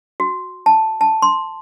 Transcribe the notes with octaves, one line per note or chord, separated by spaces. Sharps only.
F#4
A5
A5
C6